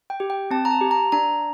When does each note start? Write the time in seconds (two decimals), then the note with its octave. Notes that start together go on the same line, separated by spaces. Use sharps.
0.10 G5
0.20 G4
0.30 G5
0.51 C4 A5
0.65 A#5
0.71 A5
0.81 G4
0.91 A#5
1.12 D4 A#5